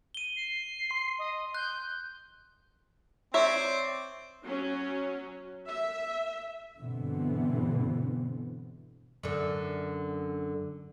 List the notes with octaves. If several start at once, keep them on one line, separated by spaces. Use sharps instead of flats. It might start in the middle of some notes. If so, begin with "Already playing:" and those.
D#7 G7
C7
C6
D#5
F#6 G6
C4 C#5 D5 E5
F#3 C#4
E5
G2 B2 D3 E3 B3 C4
F#2 D3